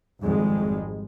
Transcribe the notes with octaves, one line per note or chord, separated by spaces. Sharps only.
G#1 F2 G3 G#3